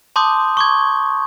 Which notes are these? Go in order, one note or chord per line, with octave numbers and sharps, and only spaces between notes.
A5 C6 D6 D#6 G6
C#6 D6 G#6